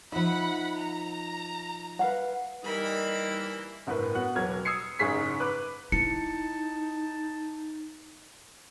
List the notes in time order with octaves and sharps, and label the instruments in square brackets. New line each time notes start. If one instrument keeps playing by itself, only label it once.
[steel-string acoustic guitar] F3 D#4 [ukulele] E5 [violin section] F#5 B5
[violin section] A#5
[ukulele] B4 F5 F#5
[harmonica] E3 A#3 E6 [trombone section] G3 D#4 [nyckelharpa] A#4 B5
[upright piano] G1 A2 A#4 B4
B3 F#4 F#5
E1 F#3 B4 F6 G#6
D#6 E6 G#6 C7 C#7
F#1 G#2 G#4 C#6 B6 C7
B4 D6 F#6
[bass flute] D#4 [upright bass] E4 [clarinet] A5 [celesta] C#7